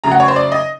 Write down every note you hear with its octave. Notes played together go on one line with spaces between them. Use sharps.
C#3 F#3 A3 A#5
F#5
C#5
C5
D5
D#5